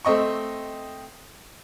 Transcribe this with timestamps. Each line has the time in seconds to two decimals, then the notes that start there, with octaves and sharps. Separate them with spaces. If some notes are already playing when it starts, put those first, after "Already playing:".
0.05 A3 C4 D#5 C#6